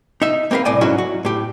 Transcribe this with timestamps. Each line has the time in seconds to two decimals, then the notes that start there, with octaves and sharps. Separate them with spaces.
0.22 D#4 E5
0.51 A#3 C4 A#4 B4 F5
0.65 C2 A2 D5 G#5
0.81 G#2 F#3 C#4 E4 F#4
0.98 F#4
1.25 A2 G4